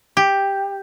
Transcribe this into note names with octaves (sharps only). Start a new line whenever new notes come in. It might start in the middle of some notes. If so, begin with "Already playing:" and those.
G4